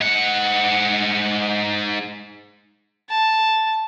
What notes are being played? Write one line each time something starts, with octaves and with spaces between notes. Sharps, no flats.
G#2 F#5
A5